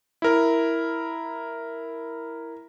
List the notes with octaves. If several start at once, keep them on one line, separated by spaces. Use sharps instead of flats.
E4 A#4